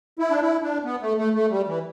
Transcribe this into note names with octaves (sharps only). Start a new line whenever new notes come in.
E4
D4
E4
D4
B3
A3
A3
A3
G3
E3